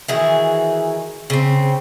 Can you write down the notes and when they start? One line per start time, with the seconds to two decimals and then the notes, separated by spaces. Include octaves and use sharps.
0.08 D#3 E3 F#4 G#4
1.30 C#3 C4